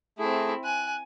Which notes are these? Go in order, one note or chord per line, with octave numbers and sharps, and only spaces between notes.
A3 C4 E4 G#4
G#5 F#6